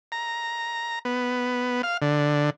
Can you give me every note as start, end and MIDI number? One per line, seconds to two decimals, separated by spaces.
0.12 0.99 82
1.05 1.82 59
1.83 1.97 77
2.02 2.50 50